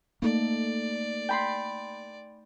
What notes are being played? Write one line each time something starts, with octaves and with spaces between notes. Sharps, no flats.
A3 A#3 D#4 A4 D5
G5 B5 C6